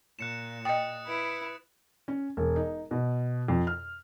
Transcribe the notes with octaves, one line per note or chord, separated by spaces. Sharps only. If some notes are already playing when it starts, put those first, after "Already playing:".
A#2 F#6 C#7 E7
D#5 G5 D#6 A6 C#7
E4 B4
C#4
E1
D#4
B2
F2
F6